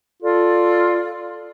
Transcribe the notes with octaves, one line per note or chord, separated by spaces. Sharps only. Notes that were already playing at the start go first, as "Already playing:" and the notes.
F4 A4 D5